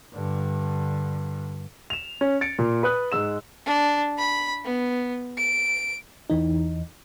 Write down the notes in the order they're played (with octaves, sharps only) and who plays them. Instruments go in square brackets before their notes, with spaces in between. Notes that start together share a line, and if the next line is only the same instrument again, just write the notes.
[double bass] G2 D3
[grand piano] E7 F7
C#4
A6 C#7 D7
A#2
B4 D#6 F#6
G#2 G#3 E6 E7
[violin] D4
B5
B3
D7
[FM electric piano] E2 E3 D#4